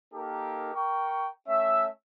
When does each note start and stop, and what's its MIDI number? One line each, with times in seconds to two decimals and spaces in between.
0.14 0.72 58
0.14 0.72 63
0.14 0.72 67
0.14 0.72 69
0.14 0.72 70
0.74 1.28 70
0.74 1.28 79
0.74 1.28 85
1.48 1.87 57
1.48 1.87 61
1.48 1.87 76